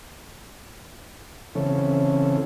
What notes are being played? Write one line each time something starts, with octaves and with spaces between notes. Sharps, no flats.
C#3 E3 C4 C#4 A4